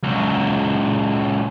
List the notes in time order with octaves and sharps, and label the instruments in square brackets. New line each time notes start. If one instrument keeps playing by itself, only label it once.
[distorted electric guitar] C#2 F#3